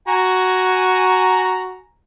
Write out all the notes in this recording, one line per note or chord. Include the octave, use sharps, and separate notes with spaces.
F#4 G#5 A#5